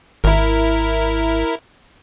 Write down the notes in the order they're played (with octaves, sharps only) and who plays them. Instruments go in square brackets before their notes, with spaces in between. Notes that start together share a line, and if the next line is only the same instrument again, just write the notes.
[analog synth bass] G#1 [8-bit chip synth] E4 A#4